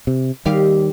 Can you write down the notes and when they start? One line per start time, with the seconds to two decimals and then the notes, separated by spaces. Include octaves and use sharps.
0.07 C3
0.46 D#2 D#3 G3 G4 F5